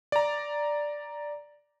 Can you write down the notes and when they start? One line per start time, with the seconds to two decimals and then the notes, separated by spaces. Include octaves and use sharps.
0.12 D5 A#5